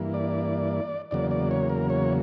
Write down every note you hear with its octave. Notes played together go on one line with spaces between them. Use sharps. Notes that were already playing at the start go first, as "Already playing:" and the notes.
Already playing: G2 E3 A#3
D5
E2 C#3 F#3 A#3 D5
D5
C#5
A#4
C#5